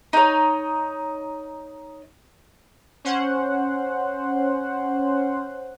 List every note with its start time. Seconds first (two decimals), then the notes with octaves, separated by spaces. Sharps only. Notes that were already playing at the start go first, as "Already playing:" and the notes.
0.13 D#4 C#5
3.04 C#4 C5 F#5